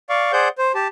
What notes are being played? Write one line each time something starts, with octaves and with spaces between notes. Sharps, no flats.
D5 F5 C#6
G#4 C5 D5 F#5 G6
C5
G4 A5